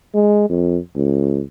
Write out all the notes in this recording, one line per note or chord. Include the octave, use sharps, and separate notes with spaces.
G#3
F2
C#2